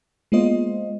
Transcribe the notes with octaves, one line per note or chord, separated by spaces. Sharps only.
G#3 A#3 B3 F4 C5 D#5